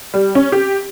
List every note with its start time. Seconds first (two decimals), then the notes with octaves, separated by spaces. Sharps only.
0.14 G3
0.35 C#4
0.52 G4